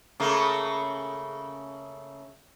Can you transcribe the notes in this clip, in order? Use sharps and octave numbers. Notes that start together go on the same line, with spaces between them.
C#3 A3 A#3